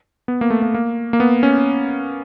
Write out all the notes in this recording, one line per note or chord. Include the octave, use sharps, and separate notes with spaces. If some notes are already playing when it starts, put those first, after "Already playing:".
B3
A#3
A3
A#3
A#3
A#3
B3
C#4